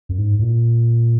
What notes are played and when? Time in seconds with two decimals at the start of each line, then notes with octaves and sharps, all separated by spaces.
0.09 F#2
0.18 G#2
0.39 G#2
0.42 A#2